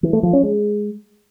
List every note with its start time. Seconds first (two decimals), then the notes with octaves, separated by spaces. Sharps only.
0.03 E3
0.13 A3
0.23 F3
0.33 C#4
0.43 G#3